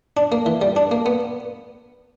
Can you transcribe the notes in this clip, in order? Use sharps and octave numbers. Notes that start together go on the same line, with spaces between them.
D4
A#3
E3
G3
D4
A#3
B3